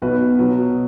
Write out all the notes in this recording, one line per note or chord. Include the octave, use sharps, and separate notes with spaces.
B1 B2 B3 F#4 B4
B2 F#3 B3 F#4